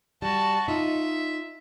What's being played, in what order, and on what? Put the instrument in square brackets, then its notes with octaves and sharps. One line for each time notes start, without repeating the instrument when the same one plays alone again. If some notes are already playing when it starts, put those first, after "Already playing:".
[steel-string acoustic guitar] G3 [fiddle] F#4 A5
[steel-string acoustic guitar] D#4 F4 [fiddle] E5